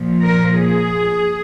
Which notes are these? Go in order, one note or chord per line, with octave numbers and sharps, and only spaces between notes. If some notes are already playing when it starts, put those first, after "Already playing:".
Already playing: A#2 F3
A#4
G#4